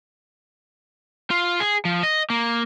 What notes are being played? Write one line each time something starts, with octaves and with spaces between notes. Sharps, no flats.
F4
G#4
F3
D#5
A#3